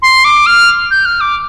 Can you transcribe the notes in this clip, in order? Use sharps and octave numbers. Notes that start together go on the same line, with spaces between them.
C6
D6
F6
G6
F6
D6